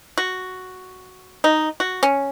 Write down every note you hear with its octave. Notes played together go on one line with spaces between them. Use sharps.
F#4
D#4
F#4
C#4